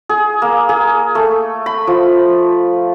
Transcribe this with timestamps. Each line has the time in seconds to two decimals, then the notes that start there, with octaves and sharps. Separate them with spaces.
0.09 G#4
0.42 A#3
0.69 G#4
1.15 A3
1.66 B5
1.87 F3